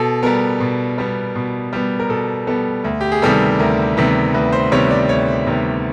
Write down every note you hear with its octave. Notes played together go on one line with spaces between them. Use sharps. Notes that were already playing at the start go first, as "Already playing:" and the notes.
Already playing: B2 A4
G3 B3 A#4
B2
G3 B3
B2
G3 B3
A#4
B2 A4
G3 B3 A4
D2
G4
G#4
C3 D#3 G3 B3 A4
D2 A#4
C3 D#3 G3 B3
D2 B4
C5
C3 D#3 G3 B3 C#5
D5
D2 C#5
C3 D#3 G3 B3